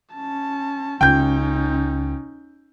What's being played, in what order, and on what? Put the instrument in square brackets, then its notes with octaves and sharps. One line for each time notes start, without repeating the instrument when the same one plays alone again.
[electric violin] C#4 A5
[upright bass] C#2 [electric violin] C#4 D#4 [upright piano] G5 G6